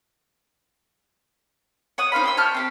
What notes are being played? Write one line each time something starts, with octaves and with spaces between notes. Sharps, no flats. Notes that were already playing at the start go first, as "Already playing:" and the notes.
C#5 F#5 D#6
D#4 C5 F5 B5
G4 C6 E6
C#5 A5 F6 G6
C4 D4 G4